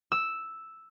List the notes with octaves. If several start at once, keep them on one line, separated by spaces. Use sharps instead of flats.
E6